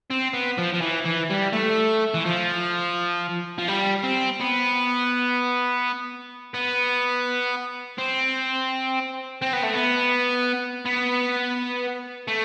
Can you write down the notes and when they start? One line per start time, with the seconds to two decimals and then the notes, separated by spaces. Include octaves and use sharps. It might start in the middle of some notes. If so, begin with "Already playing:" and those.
0.10 C4
0.33 B3
0.58 F3
0.74 F3
0.81 E3
1.05 E3
1.30 G3
1.53 A3
2.14 E3
2.25 F3
3.59 F3
3.68 G3
4.04 C4
4.40 B3
6.54 B3
7.99 C4
9.42 C4
9.53 B3
9.63 A3
9.74 B3
10.85 B3
12.28 A3